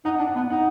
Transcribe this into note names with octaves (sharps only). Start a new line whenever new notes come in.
D#4 F#5
D4
F#5
B3
D#4 F#5